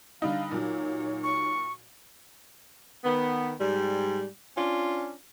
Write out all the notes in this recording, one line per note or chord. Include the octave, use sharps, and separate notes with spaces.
D3 G3 D#4 F5
A#2 F#3 D#4 C#5
C#6
D#3 B3
G#2 G3
C#4 D4 F4